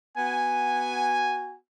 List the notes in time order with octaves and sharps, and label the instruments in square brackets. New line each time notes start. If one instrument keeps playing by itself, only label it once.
[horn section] B3 F#4 G#5